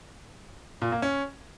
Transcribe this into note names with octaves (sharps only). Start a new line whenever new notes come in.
A#2
A#3
C#4